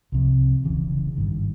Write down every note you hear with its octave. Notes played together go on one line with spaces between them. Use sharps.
C2 C3 F3
E1 E2 C#3 E3
G#1 G2 D#3